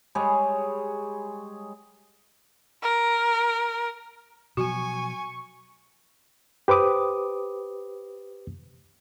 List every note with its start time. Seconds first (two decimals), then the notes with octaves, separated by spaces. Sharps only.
0.15 G3 G#3 G#4 C#5
2.83 A#4
4.57 B2 F3 F#3 F#4 G#5 C#6
6.68 G4 B4 C5 D6 D#6